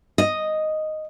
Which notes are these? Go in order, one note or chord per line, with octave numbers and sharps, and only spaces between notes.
D#5